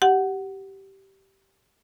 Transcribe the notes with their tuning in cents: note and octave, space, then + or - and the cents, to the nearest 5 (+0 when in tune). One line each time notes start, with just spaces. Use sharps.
G4 -15 F#5 +10